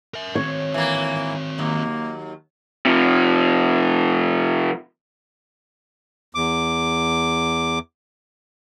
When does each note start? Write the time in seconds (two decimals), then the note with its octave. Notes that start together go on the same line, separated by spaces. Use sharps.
0.14 A#4 E5
0.35 D#3 C4 C#5
0.74 E3 A#3
1.58 D#2 F#3 A#3
2.85 C3 F3
6.35 E2 D6